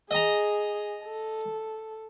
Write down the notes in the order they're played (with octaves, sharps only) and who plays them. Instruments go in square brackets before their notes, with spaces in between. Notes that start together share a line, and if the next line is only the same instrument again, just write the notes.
[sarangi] G#4 [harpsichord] D#5 A#5
[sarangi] A4